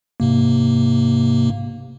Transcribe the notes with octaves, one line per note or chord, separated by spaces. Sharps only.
G#2 C3 A#3